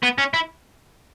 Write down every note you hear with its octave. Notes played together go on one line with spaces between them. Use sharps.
B3
C#4
E4